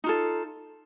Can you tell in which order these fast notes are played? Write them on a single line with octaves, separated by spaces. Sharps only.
D#4 F4 A4